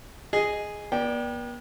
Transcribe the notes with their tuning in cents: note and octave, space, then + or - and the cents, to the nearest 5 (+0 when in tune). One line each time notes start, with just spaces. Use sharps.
G#4 +0 D#5 -5
B3 -45 D5 +0 G5 +0